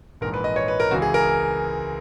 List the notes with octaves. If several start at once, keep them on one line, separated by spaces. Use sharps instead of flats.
A#1 G#2 E3 A#4
B4
D#5
C#5
B4
A#4
C#2 C#3 E3 F#4
G#4
A#4